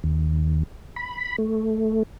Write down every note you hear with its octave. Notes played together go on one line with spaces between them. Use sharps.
D#2
B5
A3